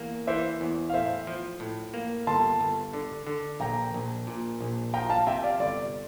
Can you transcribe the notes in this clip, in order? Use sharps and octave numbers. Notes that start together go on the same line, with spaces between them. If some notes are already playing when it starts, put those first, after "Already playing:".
Already playing: E2 A#3
E3 C5 E5
E2
F5
A2 C5 E5
F3
A2
A#3
G1 A5 C6
G1
D3
D3
A#1 G5 A#5
A#1
A#2
A#1
F3 G5 A#5
F5 A5
C3 E5 G5
D5 F5
G1 D5